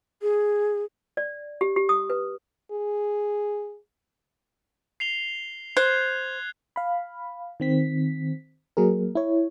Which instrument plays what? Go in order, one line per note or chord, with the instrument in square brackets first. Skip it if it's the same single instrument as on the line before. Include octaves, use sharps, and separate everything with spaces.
[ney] G#4
[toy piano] D5
G4
G4
D#6
B4
[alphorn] G#4
[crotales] C7 F7 G7
[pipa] C5 [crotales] F#6 G#6 C7
[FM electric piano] F5 B5
D#3 C4 B6
F#3 A#3 G#4 A#4
E4 C#5